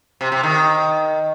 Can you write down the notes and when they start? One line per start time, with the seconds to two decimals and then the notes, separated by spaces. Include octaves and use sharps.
0.21 C3
0.32 C3
0.43 D#3